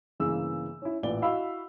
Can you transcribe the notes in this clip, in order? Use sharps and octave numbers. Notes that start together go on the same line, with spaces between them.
G1 C#3 E3 A#3 G#4 E6
C#4 E4
A1 A#2 B4 D5 G7
E4 F#4 D#5 F5 B5 E6